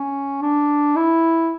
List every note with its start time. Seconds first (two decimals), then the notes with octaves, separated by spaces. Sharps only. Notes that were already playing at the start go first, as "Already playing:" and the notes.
Already playing: C#4
0.42 D4
0.96 E4